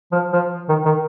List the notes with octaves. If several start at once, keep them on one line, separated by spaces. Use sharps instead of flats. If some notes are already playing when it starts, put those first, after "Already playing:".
F3
F3
D#3
D#3